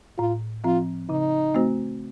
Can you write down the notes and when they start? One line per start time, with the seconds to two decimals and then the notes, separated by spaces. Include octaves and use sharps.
0.18 A2 F4
0.64 F3 C4 F4
1.09 C#3 D#4
1.54 A3 C4 F#4 C5